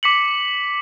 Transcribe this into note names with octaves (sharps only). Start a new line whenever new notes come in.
D6 B6 C#7 F#7